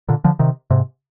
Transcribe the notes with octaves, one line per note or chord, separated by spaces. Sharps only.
A#2 D3
D3 F3
C3 D#3
G#2 C3